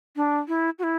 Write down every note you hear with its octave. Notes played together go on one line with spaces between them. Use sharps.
D4
E4
F#4
E4